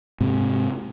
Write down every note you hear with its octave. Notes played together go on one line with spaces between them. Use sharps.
G#2 C3